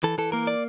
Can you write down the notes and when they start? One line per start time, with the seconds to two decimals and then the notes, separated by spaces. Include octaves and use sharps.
0.04 E3 A4
0.18 E3 A4
0.32 A#3 A#4
0.47 D5